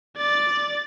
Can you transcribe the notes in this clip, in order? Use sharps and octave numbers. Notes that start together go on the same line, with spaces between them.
D5 A6